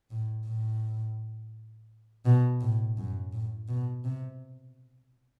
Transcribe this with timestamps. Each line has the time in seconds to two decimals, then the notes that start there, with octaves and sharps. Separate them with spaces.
0.11 A2
0.46 A2
2.25 B2
2.61 A2
2.97 F#2
3.33 A2
3.68 B2
4.04 C3